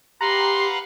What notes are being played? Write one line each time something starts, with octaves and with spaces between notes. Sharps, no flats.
G4 B4 F5 F#5 A#5 C6